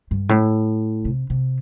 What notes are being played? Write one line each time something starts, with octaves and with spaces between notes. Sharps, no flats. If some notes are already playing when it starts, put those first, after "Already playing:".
G2
A2
C3
C3